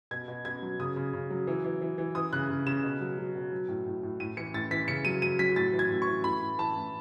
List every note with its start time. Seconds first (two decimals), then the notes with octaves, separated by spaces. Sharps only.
0.11 B2 G#6
0.28 B2
0.45 B2 G#6
0.62 F#3
0.79 C#3 D#6
0.96 C#3
1.13 C#3
1.30 F#3
1.47 E3
1.64 E3
1.81 E3
1.98 E3
2.15 E3 D#6
2.33 C#3 F#6
2.49 C#3
2.66 C#3 E7
2.83 B2
3.01 F#3
3.18 F#3
3.35 B2
3.52 F#3
3.68 A2
3.86 A2
4.03 A2
4.20 A2 D#7
4.37 E3 C#7
4.54 A2 A6
4.71 E3 B6
4.88 C#3 C#7
5.05 F#3 D#7
5.22 F#3 D#7
5.39 F#3 B6
5.56 A2 A6
5.73 E3
5.79 G#6
5.90 A2
6.02 C#6
6.07 E3
6.24 A2 B5
6.41 A2
6.59 E3 A5
6.76 A2